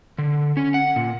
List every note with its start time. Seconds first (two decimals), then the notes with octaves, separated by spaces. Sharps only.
0.18 D3
0.57 C#4
0.74 F#5
0.96 A#2